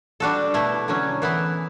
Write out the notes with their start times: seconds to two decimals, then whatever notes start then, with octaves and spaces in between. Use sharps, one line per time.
0.20 G3 D4 F#4 A4
0.54 B2 A3 E4
0.88 D3 F#3 C#4
1.22 E3 B3 E4